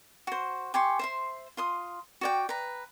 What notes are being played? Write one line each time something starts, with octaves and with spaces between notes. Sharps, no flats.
F#4 C5
G4 G#5 C6 C#6
C5 E5 C6
F4 C6 D#6
F#4 D5 G5
B4 A#5